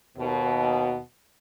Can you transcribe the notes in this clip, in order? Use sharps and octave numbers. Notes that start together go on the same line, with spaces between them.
D#2 B2